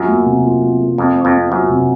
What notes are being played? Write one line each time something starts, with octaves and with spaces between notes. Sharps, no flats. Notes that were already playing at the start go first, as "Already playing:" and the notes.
Already playing: F#2 F4
A#3
C3
F4
F4
F4
F2 C4
C4
F2
C4
F#2 F4
C3